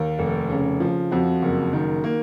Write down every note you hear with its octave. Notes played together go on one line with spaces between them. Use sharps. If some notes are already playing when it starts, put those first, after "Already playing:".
Already playing: D#2 A#4
F1
C#3
F3
F2 F#4
F#1
D#3
A#3